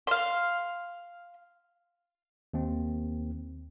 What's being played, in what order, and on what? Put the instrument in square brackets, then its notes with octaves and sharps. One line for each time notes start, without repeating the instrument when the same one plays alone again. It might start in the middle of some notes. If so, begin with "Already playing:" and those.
[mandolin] F5 C6
[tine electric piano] D#2 C4